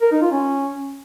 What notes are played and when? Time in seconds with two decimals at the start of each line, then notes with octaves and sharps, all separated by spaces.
0.01 A#4
0.12 D#4
0.22 F4
0.32 C#4